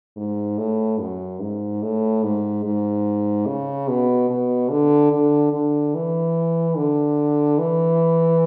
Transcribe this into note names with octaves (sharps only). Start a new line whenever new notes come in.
G#2
A2
F#2
G#2
A2
G#2
G#2
C#3
B2
B2
D3
D3
D3
E3
D3
E3